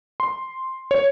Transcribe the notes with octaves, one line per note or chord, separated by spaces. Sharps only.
C6
C#5